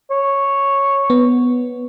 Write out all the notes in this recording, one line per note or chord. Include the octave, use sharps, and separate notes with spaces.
C#5
B3